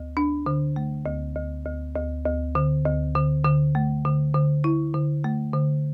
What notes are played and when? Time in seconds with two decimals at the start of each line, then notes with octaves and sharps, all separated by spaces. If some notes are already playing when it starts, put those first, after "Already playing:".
Already playing: D2
0.17 D4
0.46 D3
0.76 A3
1.06 D2
1.36 D2
1.66 D2
1.96 D2
2.26 D2
2.55 D3
2.86 D2
3.15 D3
3.45 D3
3.75 A3
4.05 D3
4.35 D3
4.64 E4
4.94 D3
5.24 A3
5.54 D3